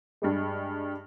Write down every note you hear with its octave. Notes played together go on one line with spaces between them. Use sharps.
G2 G3 G#3